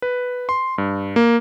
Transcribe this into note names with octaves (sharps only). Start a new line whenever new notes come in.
B4
C6
G2
A#3